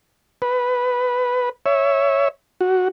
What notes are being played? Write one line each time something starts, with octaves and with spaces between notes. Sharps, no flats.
B4
C#5 E5
F#4